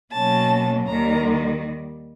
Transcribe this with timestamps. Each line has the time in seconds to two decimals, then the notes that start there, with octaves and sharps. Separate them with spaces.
0.12 B2 F#3 A#3 C#4 A5
0.87 D#2 D#3 G3 A#5